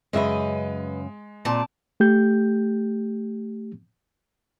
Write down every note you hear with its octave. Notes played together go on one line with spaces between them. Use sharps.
F#2 C#3 G#3 B4 D#5 E5
A#2 C4 D5 A5
A3 G4 G6